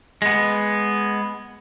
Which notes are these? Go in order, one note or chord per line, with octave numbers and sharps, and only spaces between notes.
G#3 B3